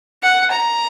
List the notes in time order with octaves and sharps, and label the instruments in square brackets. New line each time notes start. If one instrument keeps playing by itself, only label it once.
[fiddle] F#5
A#5